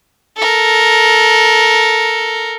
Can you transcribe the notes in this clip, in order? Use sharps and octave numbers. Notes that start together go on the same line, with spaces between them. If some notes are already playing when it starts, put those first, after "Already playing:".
A4 A#4